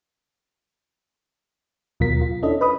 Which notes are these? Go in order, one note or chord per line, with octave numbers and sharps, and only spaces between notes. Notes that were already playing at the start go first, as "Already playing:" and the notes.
D#2 B2 F#3 F4 A#4 B6
F4
C#4 D4 E4 A4 D#5
B4 D#5 B5 D#6